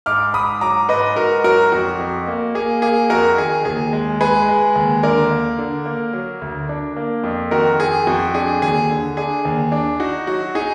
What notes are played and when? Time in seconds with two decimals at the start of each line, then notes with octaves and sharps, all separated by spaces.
0.06 G#2 D6 F6
0.34 G#2 B5 D#6
0.61 F#3 A#5 D6
0.89 G#2 B4 D#5
1.16 G#2 F#4 A#4
1.44 F#3 F#4 A#4
1.72 F2 F#4
1.99 F2
2.27 A#3
2.55 A#3 G#4
2.82 A#3 G#4
3.10 F2 F#4 A#4
3.38 D#3 G#4
3.65 D#2 G#4
3.93 G#3
4.21 G#3 G#4 B4
4.49 G#3
4.76 D#2
5.03 D3 A#4 D5
5.31 A#3
5.59 D3
5.86 A#3
6.13 F#3
6.41 D2
6.69 D4
6.96 A#3
7.24 F2
7.51 D#3 F#4 A#4
7.79 F2 G#4
8.07 F2 F#4
8.34 D4 G#4
8.62 D#2 G#4
8.90 D3
9.17 D4 G#4
9.45 D#2
9.72 D4
10.00 D#4 F#4
10.27 F#3 F#4
10.55 D#4 G#4